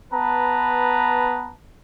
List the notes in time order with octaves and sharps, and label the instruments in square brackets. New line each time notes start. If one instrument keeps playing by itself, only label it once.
[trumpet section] B3 B4 A5 A#5